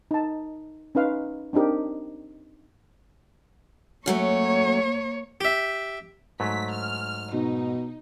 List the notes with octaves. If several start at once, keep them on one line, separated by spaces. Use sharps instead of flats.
D#4 A5
C#4 D#4 B4 F5
C4 D4 D#4 G4 A#4
F#2 F#3 A3 A#3 C#5
G4 E5
G#2 F#3 A3 B6
F6
B2 D#4